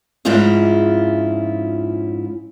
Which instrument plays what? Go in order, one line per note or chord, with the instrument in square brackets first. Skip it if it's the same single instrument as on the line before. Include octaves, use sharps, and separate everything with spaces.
[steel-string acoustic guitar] F2 G#2 C#4 E4 F4 G#4